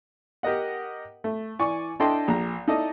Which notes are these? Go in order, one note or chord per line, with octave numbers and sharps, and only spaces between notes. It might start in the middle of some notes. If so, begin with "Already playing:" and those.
G4 A#4 D#5 F#5
A3
E3 D5 G#5 C#6
D4 E4 A4 D#5 G5 C6
A#1 A#5
D#4 E4 A4 D5 D#5